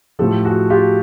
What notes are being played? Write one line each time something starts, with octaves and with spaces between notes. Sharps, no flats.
A2 F3 G4 A4
F#4 G#4
F4 G4